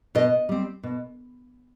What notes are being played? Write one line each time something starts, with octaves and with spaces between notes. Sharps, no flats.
B2 D#5
G3 C4
B2